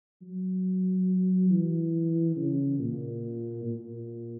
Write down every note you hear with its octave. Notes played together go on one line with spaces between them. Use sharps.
F#3
E3
C#3
A#2
A#2